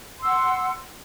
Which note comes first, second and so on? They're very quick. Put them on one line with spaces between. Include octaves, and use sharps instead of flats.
C6 E6 F#5